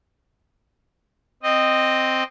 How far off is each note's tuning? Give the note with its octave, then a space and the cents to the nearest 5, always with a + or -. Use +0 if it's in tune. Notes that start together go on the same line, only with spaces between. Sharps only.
C4 +0 D#5 -10